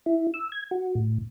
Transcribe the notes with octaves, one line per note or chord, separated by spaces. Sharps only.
E4
E6
G#6
F#4
A2